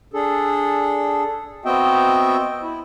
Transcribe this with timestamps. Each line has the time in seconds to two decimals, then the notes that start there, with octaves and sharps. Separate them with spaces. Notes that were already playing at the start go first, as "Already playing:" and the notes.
0.14 D4 G#4 A4
1.65 B3 C4 F#4 D#5 E5 G5
2.62 E4